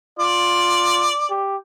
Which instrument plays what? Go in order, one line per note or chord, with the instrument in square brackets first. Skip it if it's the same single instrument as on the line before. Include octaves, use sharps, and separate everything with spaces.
[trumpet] F4 [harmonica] D5
[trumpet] G4